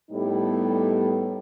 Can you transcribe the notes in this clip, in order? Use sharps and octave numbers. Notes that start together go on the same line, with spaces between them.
A2 G3 B3 D#4 G4 A4